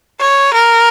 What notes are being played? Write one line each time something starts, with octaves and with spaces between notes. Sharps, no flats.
C#5
A#4